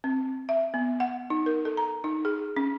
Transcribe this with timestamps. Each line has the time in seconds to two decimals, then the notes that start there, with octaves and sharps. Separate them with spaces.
0.04 C4
0.49 E5
0.74 B3
1.00 F#5
1.30 D#4
1.46 A#4
1.65 A4
1.77 A#5
2.04 D#4
2.25 G#4
2.57 C#4